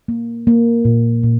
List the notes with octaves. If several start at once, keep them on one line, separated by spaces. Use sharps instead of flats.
A#3
A#3
A#2
A#2